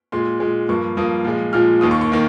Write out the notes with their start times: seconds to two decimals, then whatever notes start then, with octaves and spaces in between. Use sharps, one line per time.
0.12 A#2 G#3 C6
0.40 A#2 G#3
0.69 G2 F3 A#3 C#6
0.97 G2 F3 A#3 D#6
1.25 A#2 F3 G#3
1.53 A#2 F3 G#3 F6
1.81 D#2 D#3 A#3 D#6
1.91 C#6
2.01 C#6
2.12 D#3 A#3